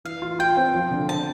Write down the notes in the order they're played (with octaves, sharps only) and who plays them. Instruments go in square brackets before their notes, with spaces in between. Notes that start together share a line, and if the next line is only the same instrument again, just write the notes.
[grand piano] E3 [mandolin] F5
[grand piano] F4
[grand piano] F4 [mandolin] G5
[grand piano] C4
F3
D3
[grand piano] C4 [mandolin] A5